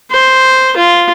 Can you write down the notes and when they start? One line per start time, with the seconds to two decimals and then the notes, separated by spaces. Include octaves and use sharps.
0.11 C5
0.77 F4